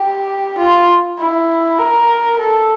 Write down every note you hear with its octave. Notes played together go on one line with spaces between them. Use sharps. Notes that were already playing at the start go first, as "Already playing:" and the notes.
Already playing: G4
F4
E4
A#4
A4